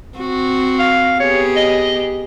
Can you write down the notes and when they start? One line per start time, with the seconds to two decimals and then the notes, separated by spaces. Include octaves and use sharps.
0.18 C4 F#4
0.79 F5
1.20 B3 G4 G#4 C#5
1.56 D#5